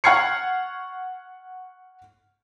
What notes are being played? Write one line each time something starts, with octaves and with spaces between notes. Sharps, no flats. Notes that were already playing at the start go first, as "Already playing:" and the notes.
F#5 C#6 F6 G#6 C7 C#7